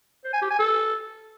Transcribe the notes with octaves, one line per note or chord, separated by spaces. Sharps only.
C5
G#5
G4
G#5
A4